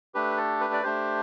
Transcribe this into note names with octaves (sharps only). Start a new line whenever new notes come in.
A3 D4 G4 B4
A4
B4
D5
A3 D4 G4 C5